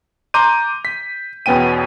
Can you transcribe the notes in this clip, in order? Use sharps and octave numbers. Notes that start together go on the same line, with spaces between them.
A#5 C6 D6 G6 D#7
B6
E2 B2 B3 C#4 G5 D#7